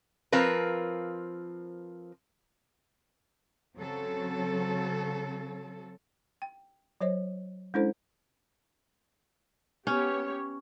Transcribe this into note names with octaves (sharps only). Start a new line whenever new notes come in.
F3 C4 F4 A#4 B4
C#3 F#3 C4 A4
G5
F#3 C5 C#5 D#5
G#3 C#4 D4 E4 A4 C5
B3 C#4 G4 C#5